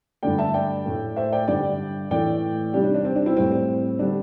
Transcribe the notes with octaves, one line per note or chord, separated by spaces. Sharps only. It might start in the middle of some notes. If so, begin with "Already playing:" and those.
G2 D3 A3 D5 G5
E5 A5
D5 G5
A2 A3
C5 E5
D5 G5
G2 D3 G3 D5 G5
A2 E3 A3 D5 G5
C3 G3 D4 G4
D4
D4
C4
D4
C4 E4
A2 G3 C4
C4
D3 G3 D4